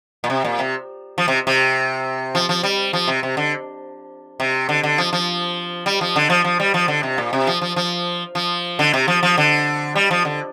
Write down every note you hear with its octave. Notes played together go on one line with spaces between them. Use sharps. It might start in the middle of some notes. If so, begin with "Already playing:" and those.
A#2
C3
A#2
C3
F3
C3
C3
F3
F3
G3
F3
C3
C3
D3
C3
D3
D3
F3
F3
G3
F3
D3
F3
F3
G3
F3
D3
C3
A#2
C3
F3
F3
F3
F3
D3
C3
F3
F3
D3
G3
F3
D3